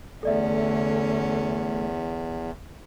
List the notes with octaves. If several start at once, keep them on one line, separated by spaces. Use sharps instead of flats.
E2 D3 A3 C#4 A4 D5 E5